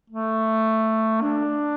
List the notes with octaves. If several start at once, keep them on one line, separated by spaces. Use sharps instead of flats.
A3
D4